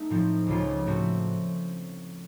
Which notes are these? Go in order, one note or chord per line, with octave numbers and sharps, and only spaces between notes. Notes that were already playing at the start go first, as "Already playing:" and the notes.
Already playing: A3 D#4
A2 F3 C4
C#2 C#3 F3 A#3 F4
A2 A3 C4 F#4